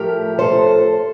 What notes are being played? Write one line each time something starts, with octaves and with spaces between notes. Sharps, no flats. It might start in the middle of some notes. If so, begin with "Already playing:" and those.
Already playing: A2 F3 A3 G4 A#4
A4 C5